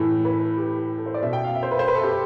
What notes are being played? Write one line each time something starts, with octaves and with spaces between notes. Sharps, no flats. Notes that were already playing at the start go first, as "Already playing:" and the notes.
Already playing: A2 E3 A4
B4
G4
A4
C5
D5
B2 E5
G5
F5
E5
C5
B4
C5
B4
A4
G4